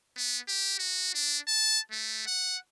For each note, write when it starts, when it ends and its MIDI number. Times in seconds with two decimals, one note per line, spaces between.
0.17 0.39 59
0.48 0.76 67
0.79 1.10 66
1.15 1.38 62
1.47 1.79 81
1.91 2.22 57
2.27 2.57 78